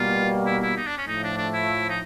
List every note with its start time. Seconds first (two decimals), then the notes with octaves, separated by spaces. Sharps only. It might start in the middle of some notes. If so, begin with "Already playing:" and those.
Already playing: B2 G3 A#3 F4
0.46 E4
0.62 E4
0.76 D#4
0.87 D4
0.97 C#4
1.07 A2 F3 A3 D#4
1.23 D4
1.37 D4
1.53 E4
1.89 D#4